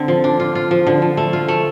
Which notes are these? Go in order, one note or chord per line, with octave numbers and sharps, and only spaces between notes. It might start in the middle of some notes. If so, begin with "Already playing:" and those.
Already playing: D3 C4
F3
D4
F4
F4
F3
D3
F3
A3
F4
A3